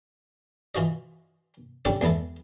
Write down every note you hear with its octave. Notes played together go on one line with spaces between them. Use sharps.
E3 F4 F#4 D#5
G3 C#4 D4 G4 A4 F#5
E2 G#3 B3 E4 A4